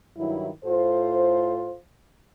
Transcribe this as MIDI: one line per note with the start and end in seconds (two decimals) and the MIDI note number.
0.17 0.48 43
0.17 0.48 51
0.17 0.48 54
0.17 0.48 64
0.65 1.75 45
0.65 1.75 65
0.65 1.75 69
0.65 1.75 72